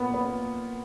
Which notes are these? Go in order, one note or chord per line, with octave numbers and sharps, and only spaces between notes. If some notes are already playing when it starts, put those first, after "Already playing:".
Already playing: A#2 B3
B3